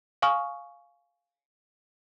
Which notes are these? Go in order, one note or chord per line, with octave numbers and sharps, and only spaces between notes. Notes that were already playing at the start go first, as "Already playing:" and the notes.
F5 G#5 C#6 D#6 F6